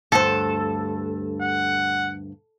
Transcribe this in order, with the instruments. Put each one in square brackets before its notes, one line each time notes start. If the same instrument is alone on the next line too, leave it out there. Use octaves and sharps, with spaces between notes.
[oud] D2 G2 C5 [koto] A4
[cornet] F#5